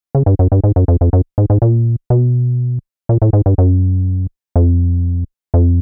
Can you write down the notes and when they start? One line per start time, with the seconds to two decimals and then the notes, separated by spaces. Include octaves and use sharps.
0.15 C#3
0.26 G2
0.39 F#2
0.52 G2
0.64 G#2
0.76 F#2
0.88 F2
1.01 F2
1.13 F#2
1.38 G#2
1.50 G#2
1.62 A#2
2.10 B2
3.09 A#2
3.22 A2
3.33 G#2
3.46 G2
3.58 F#2
4.56 F2
5.54 F2